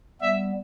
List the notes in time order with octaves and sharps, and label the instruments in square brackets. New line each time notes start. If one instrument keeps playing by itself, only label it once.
[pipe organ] G3 B3 [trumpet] E5